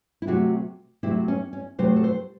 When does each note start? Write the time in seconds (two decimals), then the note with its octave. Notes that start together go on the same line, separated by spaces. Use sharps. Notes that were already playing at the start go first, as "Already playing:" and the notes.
0.22 E4
0.27 C3 F#3 A3 F#4
1.03 C3 F#3 A3 E4
1.28 C#4
1.53 C#4
1.79 C3 F#3 A3 C5
1.96 A4
2.04 C5